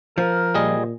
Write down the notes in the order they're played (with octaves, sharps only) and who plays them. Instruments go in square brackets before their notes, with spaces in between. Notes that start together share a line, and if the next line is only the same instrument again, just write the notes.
[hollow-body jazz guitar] F3 [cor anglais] A#4
[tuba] A#2 [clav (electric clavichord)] G3 G#4 D#5